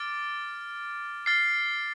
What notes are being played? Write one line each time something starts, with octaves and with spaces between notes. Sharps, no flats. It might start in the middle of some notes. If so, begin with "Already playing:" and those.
Already playing: D6 F6 A6 D7
F6 A6 C7